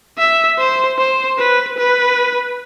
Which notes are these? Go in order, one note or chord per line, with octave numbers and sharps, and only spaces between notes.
E5
C5
C5
B4
B4